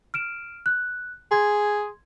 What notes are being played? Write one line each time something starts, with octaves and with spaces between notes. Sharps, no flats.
F6 D7 E7
F#6
G#4 C6 G#6